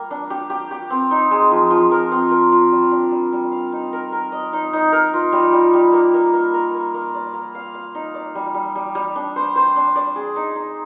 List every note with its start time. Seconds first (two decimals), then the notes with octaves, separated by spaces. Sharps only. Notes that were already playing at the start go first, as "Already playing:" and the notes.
Already playing: G3 A#3
0.11 D4
0.30 G4
0.50 G4
0.71 G4
0.90 C4
1.11 D#4
1.31 G#3
1.51 F3
1.71 F3
1.91 A#4
2.12 C4
2.31 A#4
2.52 F4
2.72 G3
2.91 D4
3.11 G3
3.33 G3
3.52 F5
3.72 D#4
3.93 A#4
4.12 A#4
4.32 D#5
4.53 D#4
4.73 D#4
4.92 A#4
5.14 F4
5.33 G3
5.53 G3
5.74 G3
5.93 A#3
6.14 A#3
6.33 A#3
6.54 A#4
6.75 A#3
6.94 A#3
7.14 D5
7.34 A#3
7.55 F5
7.75 F5
7.95 D#4
8.14 D5
8.35 G3
8.54 G3
8.76 G3
8.95 G3
9.16 D4
9.36 C5
9.56 C5
9.76 D4
9.96 D5
10.16 G#4
10.36 D#4
10.56 D#4